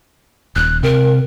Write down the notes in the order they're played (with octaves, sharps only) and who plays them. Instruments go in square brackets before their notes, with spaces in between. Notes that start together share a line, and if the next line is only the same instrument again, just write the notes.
[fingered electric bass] D#1 [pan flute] F#6
[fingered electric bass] C3 [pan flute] A#4